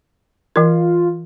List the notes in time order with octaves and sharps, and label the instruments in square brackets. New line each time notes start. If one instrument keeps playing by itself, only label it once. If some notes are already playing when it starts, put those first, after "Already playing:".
[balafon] E3 A#4 [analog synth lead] F4